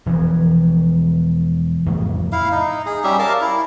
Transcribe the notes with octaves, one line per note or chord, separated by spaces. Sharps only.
E1 E3 F3
F2 A2 C#3
E4 F5
D#4
G#4
G3 C#4 G4 E5
A#4 F5 A5
E4